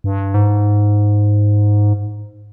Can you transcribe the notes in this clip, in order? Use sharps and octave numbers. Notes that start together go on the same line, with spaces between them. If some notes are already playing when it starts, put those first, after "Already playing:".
G2
G#2